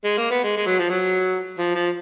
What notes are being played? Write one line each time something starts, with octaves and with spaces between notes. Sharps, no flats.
G#3
A#3
B3
G#3
G#3
F#3
F3
F#3
F3
F3